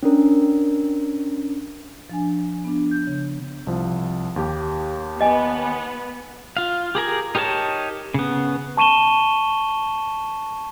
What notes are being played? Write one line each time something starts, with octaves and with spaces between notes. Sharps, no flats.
C#4 D4 A#4
F3 D4 G#5
B3 D4
G6
C#3
C2 F3
D#2 G4
B3 D#5 G#5
F4 F5
G4 G#4 A#4 G#5
D#4 G4 A#4 C#5 A5
C#3 B3
A5 C#6 D#7 E7 G7